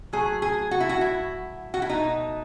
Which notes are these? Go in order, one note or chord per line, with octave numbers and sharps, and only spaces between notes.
A2 F#3 A3 G#4
G#4
F#4
E4
F#4
E4
F#4
E4
B2 A3 D#4